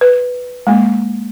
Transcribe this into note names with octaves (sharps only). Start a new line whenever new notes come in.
B4
G#3 A#3